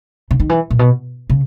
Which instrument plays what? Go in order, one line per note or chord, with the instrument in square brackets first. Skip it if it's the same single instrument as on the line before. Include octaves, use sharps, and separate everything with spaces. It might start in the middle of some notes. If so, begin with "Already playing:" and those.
[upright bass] C#3
D#3
E3
A#2
B2
C#3